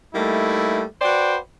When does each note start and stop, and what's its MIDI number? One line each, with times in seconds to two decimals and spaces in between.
0.14 0.83 55
0.14 0.83 57
0.14 0.83 58
0.14 0.83 63
0.14 0.83 64
1.01 1.36 66
1.01 1.36 71
1.01 1.36 72
1.01 1.36 74
1.01 1.36 79